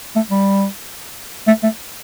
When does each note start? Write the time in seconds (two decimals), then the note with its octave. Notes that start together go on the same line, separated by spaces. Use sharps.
0.16 A3
0.31 G3
1.47 A3
1.63 A3